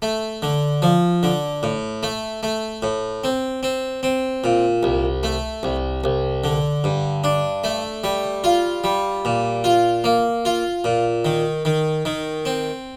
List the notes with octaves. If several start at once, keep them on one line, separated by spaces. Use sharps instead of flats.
A3
D3
F3
D3
A2
A3
A3
A2
C4
C4
C4
A#2
C2
A3
C2
C2
D3
G2
D4
A3
G3
F4
G3
A#2
F4
A#3
F4
A#2
D#3
D#3
D#3
C4